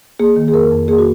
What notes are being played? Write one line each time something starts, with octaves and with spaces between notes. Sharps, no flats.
A#3 G#4
D#3
G#4
F2 A#4
F2
A#3 G#4
F#4